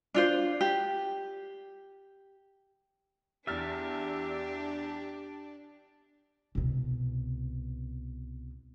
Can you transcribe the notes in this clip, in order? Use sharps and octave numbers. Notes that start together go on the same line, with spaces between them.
D4 F4 C5
G4
E2 D4 G4 E5 F6 A6
C2 B2